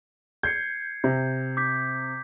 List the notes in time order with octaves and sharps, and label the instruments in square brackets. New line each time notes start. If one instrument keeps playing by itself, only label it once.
[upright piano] G6 [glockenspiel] G#6 C7 C#7
[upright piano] C3 [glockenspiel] G6
[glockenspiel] D6 G6 B6